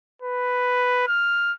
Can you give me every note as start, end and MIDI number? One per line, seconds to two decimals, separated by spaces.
0.22 1.06 71
1.07 1.53 89